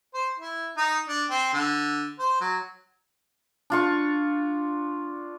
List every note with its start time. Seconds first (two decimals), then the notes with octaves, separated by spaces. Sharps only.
0.14 C5
0.39 E4
0.77 D#4
1.08 D4
1.30 C4
1.53 D3
2.19 C5
2.41 F#3
3.70 D4 F4 C#6